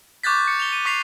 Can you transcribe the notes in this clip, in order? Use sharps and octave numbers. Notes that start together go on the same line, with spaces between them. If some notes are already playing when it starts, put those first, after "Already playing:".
C#6 D6 F#6 G6 A6 B6
C#7
F7 G7
D#7
C#6 D6 B6 C7 F7